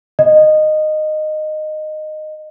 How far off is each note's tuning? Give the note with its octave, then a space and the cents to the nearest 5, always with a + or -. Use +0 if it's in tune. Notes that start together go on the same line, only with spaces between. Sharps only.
D#5 -15